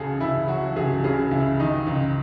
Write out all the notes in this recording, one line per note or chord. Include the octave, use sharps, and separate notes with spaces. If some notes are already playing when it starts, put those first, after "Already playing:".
Already playing: C#2 C#3 F#4 G#4 A4
C#2 E4
F#3 F#4
C#2 G#4
C#3 G#4
C#2 E4
D#3 D#4
C#2